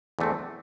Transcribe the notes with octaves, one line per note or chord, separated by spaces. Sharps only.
E2 D3 A3 C4